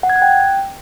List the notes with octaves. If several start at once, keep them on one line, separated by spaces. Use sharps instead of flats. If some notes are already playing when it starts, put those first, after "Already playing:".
F#5
G#6
F#6
G5